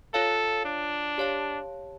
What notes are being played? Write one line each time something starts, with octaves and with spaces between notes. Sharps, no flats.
F4 A4 C#5 F5
D4
G4 C#5 F5 A5